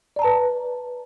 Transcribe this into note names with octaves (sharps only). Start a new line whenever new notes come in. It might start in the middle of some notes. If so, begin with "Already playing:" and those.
B4 D5 A5 A#5